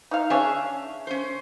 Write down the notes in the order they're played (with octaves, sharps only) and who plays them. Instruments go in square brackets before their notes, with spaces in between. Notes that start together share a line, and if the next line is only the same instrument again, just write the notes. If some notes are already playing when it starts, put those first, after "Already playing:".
[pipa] D#4 F5
[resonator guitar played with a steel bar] C#4 E5 F5 [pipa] D4 G#4 C#5
[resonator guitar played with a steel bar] C#4 C5